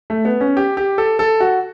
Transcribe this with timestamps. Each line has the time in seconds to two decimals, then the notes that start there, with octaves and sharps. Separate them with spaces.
0.10 A3
0.25 B3
0.41 C#4
0.57 G4
0.77 G4
0.98 A4
1.19 A4
1.40 F#4